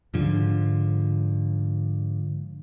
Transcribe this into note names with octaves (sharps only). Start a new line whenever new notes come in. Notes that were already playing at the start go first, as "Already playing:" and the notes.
G#2 D3 F3